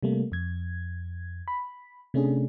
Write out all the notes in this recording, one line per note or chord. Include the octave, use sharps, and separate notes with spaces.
C3 G3 A3 A#3
F2 G#6
B5
C3 A3 C#4 D4 G#4